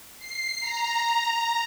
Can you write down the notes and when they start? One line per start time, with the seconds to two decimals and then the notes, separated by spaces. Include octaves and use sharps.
0.19 C7
0.60 A#5